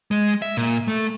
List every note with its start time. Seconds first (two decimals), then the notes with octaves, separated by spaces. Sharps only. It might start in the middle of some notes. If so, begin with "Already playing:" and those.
0.11 G#3
0.42 E5
0.57 A#2
0.88 A3